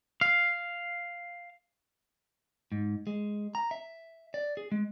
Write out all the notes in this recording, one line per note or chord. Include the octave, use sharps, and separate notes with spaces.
F5
G#2
G#3
A#5
E5
D5
G#4
G#3